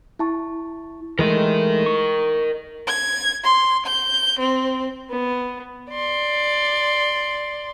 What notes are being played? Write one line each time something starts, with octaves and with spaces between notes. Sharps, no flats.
E4 A5 C#6
E3 G#3 A3 A#4 D#5
C#6
G#6
C6
G6
C4
B3
D5 C6